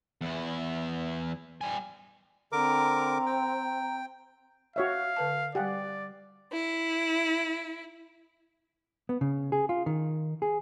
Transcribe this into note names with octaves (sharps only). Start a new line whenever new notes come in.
E2 E4
G3 G#5
D3 C4 A#4 A#5 D6
G5
F#4 C#5 E5 F5
D3 B4 A5
G3 G4 D5 F5 F#5 G#5
E4
B3
C#3
G#4
F4
D#3
G#4